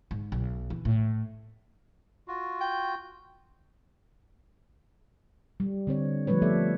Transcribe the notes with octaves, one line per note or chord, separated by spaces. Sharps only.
G#2
B1
E3
A2
F4 F#4
G5
G3
D3 C4 C#5
F3 G3 A3 B4 C#5
F3 A3 B3 A4 D5 E5